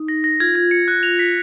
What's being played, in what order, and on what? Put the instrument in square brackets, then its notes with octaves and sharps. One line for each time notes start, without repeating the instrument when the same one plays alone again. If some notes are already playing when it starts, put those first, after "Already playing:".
Already playing: [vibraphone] D#4
[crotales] A#6
A#6
[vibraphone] F4 [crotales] G#6
[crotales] G#6
C#7
F#6
F7
B6